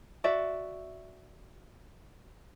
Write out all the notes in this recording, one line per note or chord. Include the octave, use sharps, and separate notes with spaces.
F#4 D5 E5